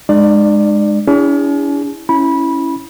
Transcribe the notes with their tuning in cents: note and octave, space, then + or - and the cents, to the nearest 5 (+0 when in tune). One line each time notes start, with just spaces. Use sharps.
G#3 +0 D#4 -45 D5 +15
C#4 +45 E4 -10 G#4 -30
C#4 +0 E4 +0 B5 -20